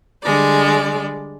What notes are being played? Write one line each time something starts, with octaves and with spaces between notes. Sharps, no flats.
D3 G3 G#3 D5